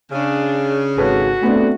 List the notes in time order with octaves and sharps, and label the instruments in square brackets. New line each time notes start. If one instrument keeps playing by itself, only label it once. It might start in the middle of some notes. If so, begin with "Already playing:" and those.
[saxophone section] C#3 [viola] D4
[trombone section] G#1 [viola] F#4 [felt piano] A4 B4 C#5
[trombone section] A3 [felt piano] B3 C4 D4